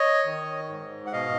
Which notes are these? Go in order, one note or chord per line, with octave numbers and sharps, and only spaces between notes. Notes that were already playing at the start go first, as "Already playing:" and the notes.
Already playing: C#5 D#5
D#3
G#2
F#5
B2 D#5 F5